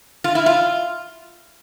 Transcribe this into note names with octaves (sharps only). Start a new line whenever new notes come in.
F4
E4
F4